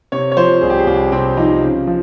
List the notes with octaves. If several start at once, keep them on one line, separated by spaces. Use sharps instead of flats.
C3 C#5
C#5
F3 C5
C2 G#4
G4
G#4
C2 G4
C3 C4
F3 D#4
C#3
F3